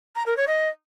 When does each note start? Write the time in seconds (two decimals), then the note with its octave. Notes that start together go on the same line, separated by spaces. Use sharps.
0.15 A#5
0.26 A#4
0.37 C#5
0.47 D#5